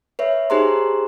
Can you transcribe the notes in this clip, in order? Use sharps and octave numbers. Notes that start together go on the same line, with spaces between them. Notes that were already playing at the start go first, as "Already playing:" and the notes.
B4 C#5 E5
D#4 G4 G#4 C5 A#5 C6